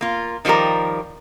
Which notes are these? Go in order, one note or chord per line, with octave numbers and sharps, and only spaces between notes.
A#3 F4
D#3 F3 G3 G4 A#4